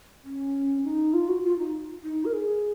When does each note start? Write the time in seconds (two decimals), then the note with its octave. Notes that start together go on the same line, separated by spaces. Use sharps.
0.24 C#4
0.84 D#4
1.14 F4
1.29 F#4
1.44 F4
1.58 D#4
2.04 D#4
2.25 A#4
2.33 G#4